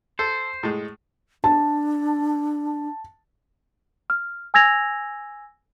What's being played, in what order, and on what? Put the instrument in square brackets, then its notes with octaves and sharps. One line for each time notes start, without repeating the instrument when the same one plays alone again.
[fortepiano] A4 [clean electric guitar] C5
[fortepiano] A2 G#3
[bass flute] D4 [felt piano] A5
[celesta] F6
G#5 E6 G#6 A#6 F7